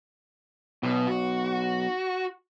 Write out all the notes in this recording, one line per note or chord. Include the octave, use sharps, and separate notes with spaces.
B1 B2
F#4